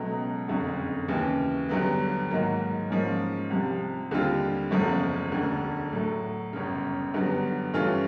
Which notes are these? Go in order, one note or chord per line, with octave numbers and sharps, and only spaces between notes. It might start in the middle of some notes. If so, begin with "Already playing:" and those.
Already playing: C#2 B2 F#3 A3
F#1 F2 D3
D#2 C#3 E3
G2 D3 F#3 B3
G#2 D#3 F#3 A#3
G#2 F3 A#3 C#4
C2 C3 F3
D#2 D3 G3 C4 F4
F#1 E2 C#3 F3 A3
E1 D2 D3
A2 F#3 A3
G1 F#2 C#3
G2 D3 F#3 B3
G2 E3 A3 C#4 F4